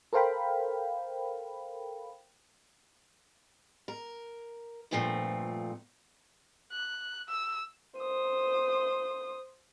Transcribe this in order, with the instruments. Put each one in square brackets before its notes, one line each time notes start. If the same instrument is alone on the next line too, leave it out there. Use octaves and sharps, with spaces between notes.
[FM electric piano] A4 A#4 C5 F5 G5 B5
[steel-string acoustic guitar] A#4
D2 G2 A#2 F3 A3 C4
[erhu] F#6
E6
[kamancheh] C5 D#6